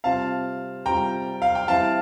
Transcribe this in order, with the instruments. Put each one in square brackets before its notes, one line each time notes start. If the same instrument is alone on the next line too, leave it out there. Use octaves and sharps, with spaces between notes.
[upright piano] C3 G3 C4 F4 [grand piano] F5 A5
[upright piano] C3 G3 C4 F4 [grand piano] G5 A#5
[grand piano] F5
G5
[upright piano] E3 G3 C4 E4 [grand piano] F5 A5